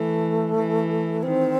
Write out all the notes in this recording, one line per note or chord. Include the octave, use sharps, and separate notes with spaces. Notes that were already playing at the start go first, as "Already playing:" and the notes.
Already playing: E3 A3
E3
D#3 C4